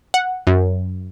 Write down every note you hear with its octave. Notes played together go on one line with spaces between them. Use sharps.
F#5
F#2